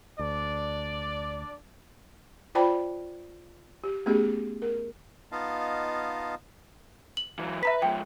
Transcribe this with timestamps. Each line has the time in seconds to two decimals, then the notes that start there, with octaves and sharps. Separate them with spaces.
0.19 D2 D4 D5
2.55 F4 C5 D5 G5 A5 B5
3.84 G4
4.06 A3 B3 C#4 G4 G#4
4.62 A#4
5.32 B3 D#4 F4 D#5 F5 A5
7.17 F#7
7.39 E3 F#3
7.63 B4 E5 A#5 B6
7.82 G#2 F3 G5